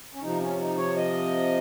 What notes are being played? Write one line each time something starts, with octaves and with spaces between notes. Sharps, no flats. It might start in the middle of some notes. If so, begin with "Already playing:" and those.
C#4
C3 F3 D#4
C#4
D#4
C#5
D#5